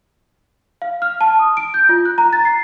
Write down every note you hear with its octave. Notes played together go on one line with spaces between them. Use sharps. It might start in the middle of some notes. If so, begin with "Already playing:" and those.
F5
F6
A5
D#6
D7
G6
F4
F#6
A#5
A6
C7